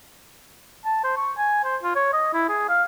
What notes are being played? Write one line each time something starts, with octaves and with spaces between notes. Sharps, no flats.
A5
C5
C#6
G#5
C5
F4
C#5
D#5
E4
G#4
F5